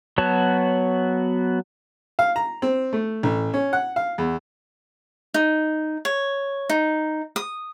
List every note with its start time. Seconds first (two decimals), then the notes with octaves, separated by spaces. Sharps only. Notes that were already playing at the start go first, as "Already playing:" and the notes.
0.18 F#3 B3 F#4 C#5 A5
2.19 F5
2.36 A#5
2.62 C4
2.93 A3
3.23 A1
3.54 C#4
3.73 F#5
3.96 F5
4.18 E2
5.34 D#4
6.05 C#5
6.70 D#4
7.36 D#6